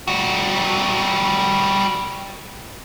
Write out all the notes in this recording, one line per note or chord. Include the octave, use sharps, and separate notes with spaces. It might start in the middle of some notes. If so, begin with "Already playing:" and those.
G3 F#4